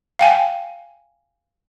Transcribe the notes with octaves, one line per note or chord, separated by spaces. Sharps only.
F5 G5 G#5